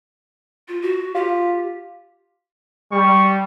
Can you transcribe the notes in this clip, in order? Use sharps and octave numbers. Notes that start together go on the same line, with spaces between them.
F4
F#4
F4 G4
G3 C#6